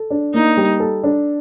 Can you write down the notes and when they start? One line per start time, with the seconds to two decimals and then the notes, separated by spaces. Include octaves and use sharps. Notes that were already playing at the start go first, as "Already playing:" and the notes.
Already playing: A4
0.10 D4
0.34 A#3 D#4
0.57 G3
0.80 A4
1.03 D4